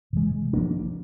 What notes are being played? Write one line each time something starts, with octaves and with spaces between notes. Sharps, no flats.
C3 E3 G#3
F3 A#3 D4